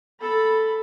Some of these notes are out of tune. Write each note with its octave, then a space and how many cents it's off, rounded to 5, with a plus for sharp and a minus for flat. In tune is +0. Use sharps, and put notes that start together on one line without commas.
A4 +0 B5 +0